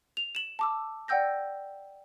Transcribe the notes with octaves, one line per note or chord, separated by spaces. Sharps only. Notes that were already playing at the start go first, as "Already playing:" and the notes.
F7
E7 F#7
A5 D6 E6
D5 F#5 G5 E6 G6 A#6